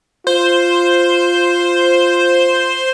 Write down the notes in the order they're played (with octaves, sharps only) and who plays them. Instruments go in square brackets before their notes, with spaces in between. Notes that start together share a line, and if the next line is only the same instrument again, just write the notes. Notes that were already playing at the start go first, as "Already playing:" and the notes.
[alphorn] F4 [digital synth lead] C5